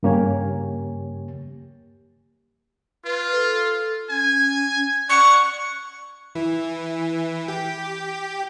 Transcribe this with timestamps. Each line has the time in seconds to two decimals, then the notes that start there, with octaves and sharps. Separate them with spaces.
0.03 G2 C#3 A#3 G4 C#5 G#5
3.05 F4 B4
3.36 A4
4.10 C#4 G#5
5.09 D5 F#5 C#6
6.35 E3
7.48 G4